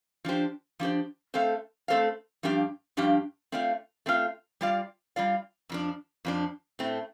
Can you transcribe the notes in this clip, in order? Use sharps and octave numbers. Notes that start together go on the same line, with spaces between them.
F3 D4 G4 C5
F3 D4 G4 C5
A3 C4 A4 C5 F5
A3 C4 A4 C5 F5
G2 F3 D4 G4 F5
G2 F3 D4 G4 F5
A3 C4 F4 D5 F5
A3 C4 F4 D5 F5
G3 F4 D5 F5
G3 F4 D5 F5
F2 F3 D4
F2 F3 D4
A2 A3 C4